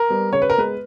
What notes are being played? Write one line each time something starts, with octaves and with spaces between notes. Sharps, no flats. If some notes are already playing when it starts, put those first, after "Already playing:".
Already playing: A#4
G3 B3
C#3 C#5
B4
A#4
G#3 B3 B4